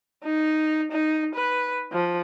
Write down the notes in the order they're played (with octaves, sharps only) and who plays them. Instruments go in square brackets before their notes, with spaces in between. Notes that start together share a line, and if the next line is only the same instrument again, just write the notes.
[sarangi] D#4
D#4
B4
F3